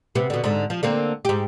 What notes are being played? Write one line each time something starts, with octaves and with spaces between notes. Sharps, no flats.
C3 B3
B2 D3
G#2 D3
F3
D3 A#3 C4
G#2 G4